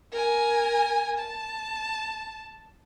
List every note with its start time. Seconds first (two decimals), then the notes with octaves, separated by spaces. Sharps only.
0.12 A#4 G#5
1.19 A5